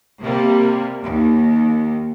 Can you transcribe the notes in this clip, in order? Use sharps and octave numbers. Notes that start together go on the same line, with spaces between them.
C3 G3 A#3
D#2